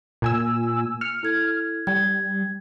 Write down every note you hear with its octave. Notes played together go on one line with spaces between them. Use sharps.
A#2 G#5 E6
F6 C#7
E4 A4 G#6
G3 G#6